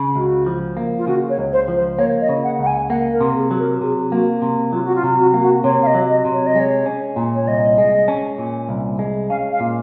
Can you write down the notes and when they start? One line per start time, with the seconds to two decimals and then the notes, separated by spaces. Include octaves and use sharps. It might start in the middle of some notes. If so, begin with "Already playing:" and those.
Already playing: C#3
0.16 C#2 F#4
0.46 F3
0.77 A#3
0.98 F4
1.07 C#3 F#4
1.30 C#5
1.38 C#2
1.52 C5
1.68 F3
1.76 C5
1.98 A#3 C#5
2.21 D#5
2.29 C#3
2.44 F#5
2.59 C#2 F#5
2.67 G#5
2.89 A#3 F#5
3.13 A#4
3.21 C3
3.36 G#4
3.51 F#3
3.59 A#4
3.81 C3 G#4
4.12 A#3 F#4
4.42 C3
4.73 F#3 F4
4.85 F#4
4.96 F4
5.03 C3
5.19 F#4
5.34 A#3
5.41 F#4
5.64 C3 C#5
5.83 F5
5.87 D#5
5.94 F#3
6.09 D#5
6.25 C3
6.33 C#5
6.47 D#5
6.56 G#3 C#5
6.86 C#4
7.16 A#2
7.35 C#5
7.47 C2 D#5
7.78 G#3
8.08 C#4
8.38 A#2
8.69 C2
8.99 G#3
9.29 C#4 F5
9.53 F5
9.60 A#2